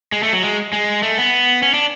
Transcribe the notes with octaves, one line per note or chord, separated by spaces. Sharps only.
G#3
A3
F#3
G#3
G#3
A3
B3
C#4
D4